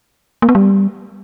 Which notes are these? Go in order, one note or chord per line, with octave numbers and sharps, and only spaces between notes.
A#3
B3
G3